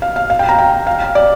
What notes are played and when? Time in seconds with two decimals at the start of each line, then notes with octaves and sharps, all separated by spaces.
0.02 F5
0.16 F5
0.30 F5
0.39 G5
0.49 A#5
0.59 G5
0.87 F5
1.15 D5